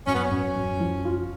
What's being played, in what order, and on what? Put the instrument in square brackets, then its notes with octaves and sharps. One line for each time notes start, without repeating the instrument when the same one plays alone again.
[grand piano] F#2 [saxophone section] C#4
[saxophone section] B3
C#4
[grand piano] F#2
F#2
F3
F4